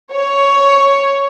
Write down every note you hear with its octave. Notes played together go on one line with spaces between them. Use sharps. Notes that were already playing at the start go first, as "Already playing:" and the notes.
C#5